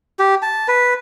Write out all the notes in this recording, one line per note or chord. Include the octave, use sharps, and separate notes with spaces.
G4
A5
B4